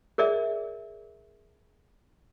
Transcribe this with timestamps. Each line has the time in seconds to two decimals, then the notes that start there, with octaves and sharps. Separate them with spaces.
0.18 G#4 A#4 D5 E5